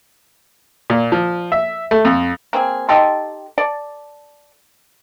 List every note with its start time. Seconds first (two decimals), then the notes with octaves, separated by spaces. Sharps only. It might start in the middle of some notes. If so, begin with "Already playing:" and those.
0.90 A#2
1.12 F3
1.52 E5
1.91 A3
2.05 F2
2.53 A#3 C4 G#4
2.89 D#4 G4 A4 C6
3.58 A4 D5